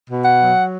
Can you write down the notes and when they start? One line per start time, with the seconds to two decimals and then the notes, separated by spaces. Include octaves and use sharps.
0.09 B2
0.24 F#5
0.39 F#3